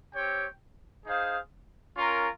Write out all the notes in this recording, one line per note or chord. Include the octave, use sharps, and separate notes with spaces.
C4 G4 C#5 G5
D#4 G#4 C5 F5
C#4 F4 A#4